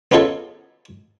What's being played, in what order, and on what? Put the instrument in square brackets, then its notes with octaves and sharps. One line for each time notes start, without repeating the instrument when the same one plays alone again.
[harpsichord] B3 C#4 D#4 F4 G#4 A4